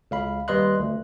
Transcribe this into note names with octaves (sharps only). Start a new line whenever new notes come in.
C#2 F5 B5
D#2 G3 B4 D#5 C6 F#6
D2